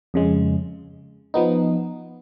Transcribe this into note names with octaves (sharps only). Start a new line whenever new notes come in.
F2 C#3 G#3
F3 B3 D#4